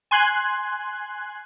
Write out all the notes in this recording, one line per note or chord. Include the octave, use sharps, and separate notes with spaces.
G#5 C6 F#6 G#6